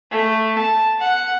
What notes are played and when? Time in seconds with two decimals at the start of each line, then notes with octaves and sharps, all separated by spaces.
0.11 A3
0.58 A5
1.00 F#5